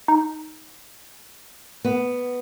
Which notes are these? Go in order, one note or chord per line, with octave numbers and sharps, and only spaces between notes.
D#4
B3